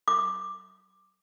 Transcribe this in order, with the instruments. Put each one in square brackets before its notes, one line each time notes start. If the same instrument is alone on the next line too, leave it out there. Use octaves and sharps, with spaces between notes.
[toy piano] D6